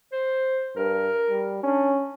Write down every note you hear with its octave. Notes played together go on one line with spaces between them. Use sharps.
C5
G2 A#4
G3
C#4 D4